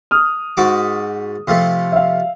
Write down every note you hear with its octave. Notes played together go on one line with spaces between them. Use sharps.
D#6 F6
G#2 F#4 D6
C3 F3 A3
E5 F5